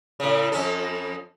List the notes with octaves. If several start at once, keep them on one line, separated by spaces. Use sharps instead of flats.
A2 C#3
F2 C#4 A4